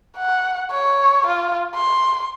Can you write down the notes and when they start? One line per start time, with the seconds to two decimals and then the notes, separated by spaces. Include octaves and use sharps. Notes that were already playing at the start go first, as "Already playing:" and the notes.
0.17 F#5
0.71 C#5
1.27 F4
1.75 C6